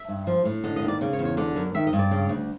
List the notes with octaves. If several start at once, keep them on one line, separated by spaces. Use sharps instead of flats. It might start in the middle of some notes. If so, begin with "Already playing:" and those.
Already playing: E5
G2
F3
A2
D3 D#5
D#5
D#2
D5
C#3
C#5
E2
C#5
D3 D5
F#2
D#3 E5
D#5
G2
D5
C#3
D2